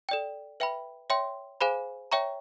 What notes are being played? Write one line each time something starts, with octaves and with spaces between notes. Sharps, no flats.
A4 D5 G5
B4 E5 G5 B5
C#5 E5 G5 C6
G#4 C5 F5 G#5 B5
C#5 E5 G5 A#5 C#6